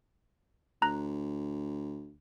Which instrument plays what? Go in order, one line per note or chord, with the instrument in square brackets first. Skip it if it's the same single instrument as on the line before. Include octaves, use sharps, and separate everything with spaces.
[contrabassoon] D2 [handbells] A#5 F#6